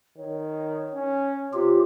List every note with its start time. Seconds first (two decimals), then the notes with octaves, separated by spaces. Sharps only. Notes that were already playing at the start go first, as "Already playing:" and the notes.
0.18 D#3 C#5
0.93 C#4
1.53 C3 F4 G4